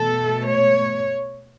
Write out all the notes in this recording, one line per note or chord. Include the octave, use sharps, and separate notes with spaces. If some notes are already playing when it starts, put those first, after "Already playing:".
Already playing: B2 A3 A4
C#5